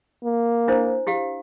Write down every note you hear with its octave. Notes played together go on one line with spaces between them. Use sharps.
A#3
D4 E4 C5
E4 G4 F5